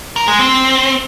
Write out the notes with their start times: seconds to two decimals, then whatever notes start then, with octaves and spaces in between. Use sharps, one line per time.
0.16 A#4
0.28 G#3
0.39 C4